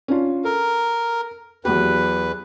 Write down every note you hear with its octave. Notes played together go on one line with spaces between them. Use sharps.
C#4 D4 F4
A4 A#4
E2 F#3 B3 G4 B4